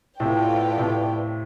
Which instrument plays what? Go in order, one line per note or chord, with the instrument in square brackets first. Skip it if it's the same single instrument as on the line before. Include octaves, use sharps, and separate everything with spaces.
[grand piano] A2 C3 [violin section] B3 F4 A4 D5 G5
[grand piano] A2 C3